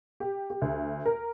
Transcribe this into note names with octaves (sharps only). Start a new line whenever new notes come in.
G4
G4
D2
A#4